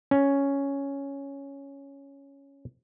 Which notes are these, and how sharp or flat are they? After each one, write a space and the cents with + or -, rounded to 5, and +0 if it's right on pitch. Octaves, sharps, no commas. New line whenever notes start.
C#4 +5